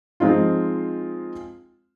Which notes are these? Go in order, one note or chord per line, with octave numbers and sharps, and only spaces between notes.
F3 G#3 C4 D#4 F4